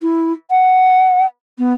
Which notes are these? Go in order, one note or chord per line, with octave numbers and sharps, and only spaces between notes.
E4
F#5
B3